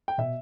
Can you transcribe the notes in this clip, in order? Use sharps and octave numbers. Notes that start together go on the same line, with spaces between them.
G5
B2 E5